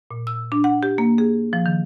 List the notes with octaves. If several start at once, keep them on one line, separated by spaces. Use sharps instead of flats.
A#2
E6
D4
F#5
G4
A#3
G#4
F3
D#3